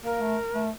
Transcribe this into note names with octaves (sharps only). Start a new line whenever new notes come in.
A#3 A#4
A3
A3